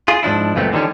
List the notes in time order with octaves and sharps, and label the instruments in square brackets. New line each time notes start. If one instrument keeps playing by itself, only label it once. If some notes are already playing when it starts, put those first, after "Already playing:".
[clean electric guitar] F4 G#4
G#2 F3 D4 E4
C#2 F#2 A#2 A3 B3 C4
D3 D#3 F3 G3 C#4